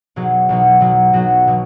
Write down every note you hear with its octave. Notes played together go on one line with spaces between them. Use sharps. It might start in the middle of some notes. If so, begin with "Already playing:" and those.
B1 B2 F#3 G#4
B1 B2 F#3
B1 B2 F#3
B1 B2 F#3 F#4
B2 F#3